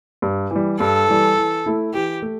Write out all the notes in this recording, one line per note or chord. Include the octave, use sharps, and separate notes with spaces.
G2
E3 G3
G2 A4
E3 G3
E3
A3 E4
E3 G4
A3